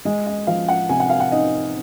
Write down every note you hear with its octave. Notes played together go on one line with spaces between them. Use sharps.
G#3 D#5
D#5
F3 F5
F#5
C3 G#5
F#5
F5
F#5
D#4 D#5